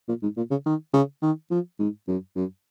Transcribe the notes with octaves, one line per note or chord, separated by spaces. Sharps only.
A#2
G#2
A#2
C#3
D#3
C#3
D#3
F3
G#2
F#2
F#2